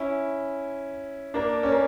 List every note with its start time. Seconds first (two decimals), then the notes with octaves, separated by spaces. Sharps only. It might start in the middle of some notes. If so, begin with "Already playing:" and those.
Already playing: C#4 E4
1.34 A#3 D4
1.63 C#4
1.72 A#3